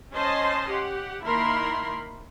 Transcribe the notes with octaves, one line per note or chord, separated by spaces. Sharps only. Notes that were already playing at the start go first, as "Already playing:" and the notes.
C#4 C5 D#5 A5 C6
G4 F#5
D#3 A#3 E4 A#4 B5 C6